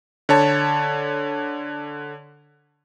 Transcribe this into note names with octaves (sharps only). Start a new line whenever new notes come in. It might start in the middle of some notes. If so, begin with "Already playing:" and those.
D3 C#5 A5